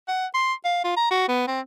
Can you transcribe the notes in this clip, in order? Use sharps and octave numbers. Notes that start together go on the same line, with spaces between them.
F#5
C6
F5
F4
A#5
F#4
B3
C4